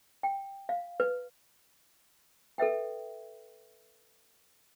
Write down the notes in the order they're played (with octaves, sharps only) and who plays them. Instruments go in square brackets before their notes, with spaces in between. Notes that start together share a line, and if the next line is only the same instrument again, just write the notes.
[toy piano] G5
F5
B4
A4 B4 E5 G5